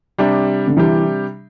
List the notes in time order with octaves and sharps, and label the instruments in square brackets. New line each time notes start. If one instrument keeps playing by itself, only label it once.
[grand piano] C3 G3 D4 G4
[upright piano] D3
[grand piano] C3 G3 D4 G4 [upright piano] E3